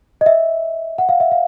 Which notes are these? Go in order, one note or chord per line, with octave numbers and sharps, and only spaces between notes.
D#5
E5
F#5
F5
E5
F5